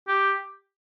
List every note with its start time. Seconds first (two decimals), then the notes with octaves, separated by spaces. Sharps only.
0.08 G4